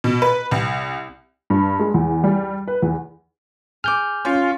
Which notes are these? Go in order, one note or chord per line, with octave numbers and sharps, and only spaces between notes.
B2
B4
C2
G2
G#3
E2
G3
B4
E2
G#4 D6 F6 G6
C#4 F4